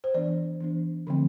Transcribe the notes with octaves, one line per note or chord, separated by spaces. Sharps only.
C5
E3 B3 D4 D5
E3 B3 D4
D3 F3 A3 C4